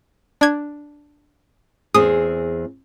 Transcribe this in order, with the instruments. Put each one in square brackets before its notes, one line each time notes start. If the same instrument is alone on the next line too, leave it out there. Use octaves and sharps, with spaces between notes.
[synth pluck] D4 G#6
[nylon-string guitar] E2 C4 G#4 [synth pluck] D#6